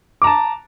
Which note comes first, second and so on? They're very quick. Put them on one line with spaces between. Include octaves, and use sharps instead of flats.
D6 A#5 A5